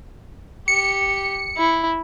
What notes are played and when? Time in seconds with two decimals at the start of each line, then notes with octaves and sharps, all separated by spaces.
0.68 G4 C#7
1.57 E4